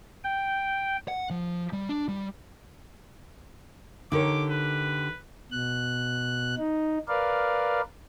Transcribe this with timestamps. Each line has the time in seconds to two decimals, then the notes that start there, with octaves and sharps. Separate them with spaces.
0.24 G5
1.08 F#5
1.30 F3
1.73 G3
1.89 D4
2.08 G3
4.12 D3 D#4 G4 A#4 C#5 D6
4.49 B4
5.51 B2 F#6
6.57 D#4
7.08 A#4 B4 D5 F5